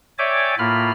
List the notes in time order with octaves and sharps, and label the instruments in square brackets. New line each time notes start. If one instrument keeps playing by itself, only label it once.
[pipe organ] C#5 D5 E5 G5 G#5 D6
A2 A#3 F4 B5 F6